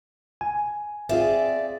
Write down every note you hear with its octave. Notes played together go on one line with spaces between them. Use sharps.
G#5
C4 F4 G#4 D5 E5